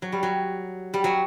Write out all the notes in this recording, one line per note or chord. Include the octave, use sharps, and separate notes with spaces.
F#3
G3
F#3
G3
F#3